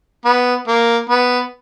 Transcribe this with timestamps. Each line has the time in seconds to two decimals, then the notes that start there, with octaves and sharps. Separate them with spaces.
0.25 B3
0.68 A#3
1.10 B3